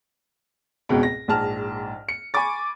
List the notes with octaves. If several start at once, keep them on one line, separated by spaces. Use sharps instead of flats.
F1 C#2 G#2 B2
A#6
A#1 G#2 A5 F6
C#7
G#5 B5 C#6 D6 A6